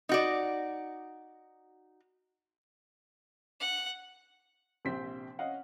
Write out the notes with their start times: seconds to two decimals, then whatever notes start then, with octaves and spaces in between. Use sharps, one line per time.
0.09 D#4 F#4 D5
3.60 F#5
4.85 A#1 C3 C4 C5 B6
5.39 C#4 D#5 F5 F#5